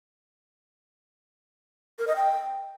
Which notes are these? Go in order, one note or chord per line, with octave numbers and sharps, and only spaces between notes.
A#4
D#5
G5